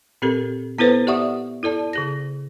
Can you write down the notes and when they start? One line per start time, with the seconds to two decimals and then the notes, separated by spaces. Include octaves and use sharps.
0.22 A#2 C4 G4 A4 A#4
0.78 B3 E4 A4 B4 C5
1.07 G4 D5 E5 F#5 C#6 D#6
1.63 E4 A4 D5 A5
1.93 C#3 G#4 A#6